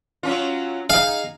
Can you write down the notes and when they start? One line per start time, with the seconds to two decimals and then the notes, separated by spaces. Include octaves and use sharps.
0.23 F#3 C#4 F4
0.90 D#4 G#4 F5